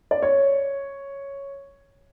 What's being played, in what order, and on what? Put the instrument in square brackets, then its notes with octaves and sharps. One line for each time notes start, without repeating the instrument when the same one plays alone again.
[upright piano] D5
C#5